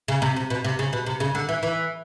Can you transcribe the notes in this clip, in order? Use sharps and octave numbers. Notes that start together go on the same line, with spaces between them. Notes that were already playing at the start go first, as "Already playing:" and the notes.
C#3
C3
C3
B2
C3
C#3
B2
C3
C#3
D3
E3
E3